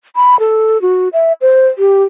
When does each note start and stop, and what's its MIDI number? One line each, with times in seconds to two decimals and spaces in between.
0.16 0.38 83
0.39 0.80 69
0.82 1.08 66
1.13 1.33 76
1.41 1.68 72
1.78 2.04 67